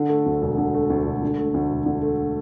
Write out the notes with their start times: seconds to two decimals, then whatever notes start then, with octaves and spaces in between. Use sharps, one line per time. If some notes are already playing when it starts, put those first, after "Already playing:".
Already playing: D3
0.09 A3
0.26 D2
0.42 E1
0.58 D3
0.74 A3
0.90 D2
1.06 E1
1.22 D3
1.38 A3
1.54 D2
1.71 E1
1.86 D3
2.02 A3